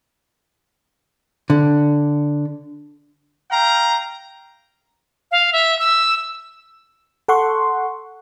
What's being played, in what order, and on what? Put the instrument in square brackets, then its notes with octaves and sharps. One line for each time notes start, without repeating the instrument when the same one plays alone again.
[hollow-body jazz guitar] D3
[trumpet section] F5 G5 A#5
[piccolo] F5
E5
E6
[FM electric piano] A4 F#5 C6 C#6